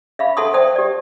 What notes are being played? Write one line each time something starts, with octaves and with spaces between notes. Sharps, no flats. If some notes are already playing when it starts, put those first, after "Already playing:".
E5 F5 B5
A4 E5 F#5 A5 C6 D#6
C5 D5 E5 G5 A5 D#6
G4 D5